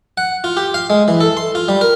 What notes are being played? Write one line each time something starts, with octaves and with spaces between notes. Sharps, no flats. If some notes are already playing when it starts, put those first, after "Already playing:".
F#5
F4
G4
F5
G#3
E3
A4
C6
F4
G3
A#4